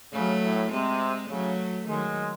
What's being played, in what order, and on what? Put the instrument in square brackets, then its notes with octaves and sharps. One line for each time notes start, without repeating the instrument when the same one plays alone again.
[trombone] C#3 [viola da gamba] F#3 A3
[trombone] A2
[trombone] C3 [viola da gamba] G#3 C4
[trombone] C#3 [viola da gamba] F#3 A3
[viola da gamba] D#3 F#3 [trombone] G#3